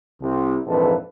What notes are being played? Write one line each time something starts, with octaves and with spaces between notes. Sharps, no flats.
C2
A#1 F2 G#2 E3 A4 B4